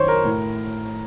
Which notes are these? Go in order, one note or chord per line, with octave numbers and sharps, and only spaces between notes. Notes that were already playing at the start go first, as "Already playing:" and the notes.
Already playing: F#2 D#3 C5 C#5
A#4
A2